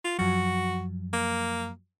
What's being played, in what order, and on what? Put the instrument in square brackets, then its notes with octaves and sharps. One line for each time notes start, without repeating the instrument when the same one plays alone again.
[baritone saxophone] F4
[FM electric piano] F#2 F3 F#3 [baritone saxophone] F#4
[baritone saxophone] A#3